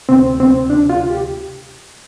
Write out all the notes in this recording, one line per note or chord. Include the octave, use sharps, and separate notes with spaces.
D2 C3 C4
C4
D4
F4
G4